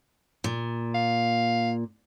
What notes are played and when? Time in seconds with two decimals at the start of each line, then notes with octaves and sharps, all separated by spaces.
0.44 A#2
0.95 F5